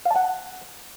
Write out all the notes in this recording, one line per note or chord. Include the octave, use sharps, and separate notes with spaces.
F5
A5
F#5